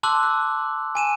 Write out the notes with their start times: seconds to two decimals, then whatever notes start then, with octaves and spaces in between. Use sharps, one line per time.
0.03 A5 C6 D6 E6 F#6 F#7
0.23 F#6
0.95 G#5 D#7 E7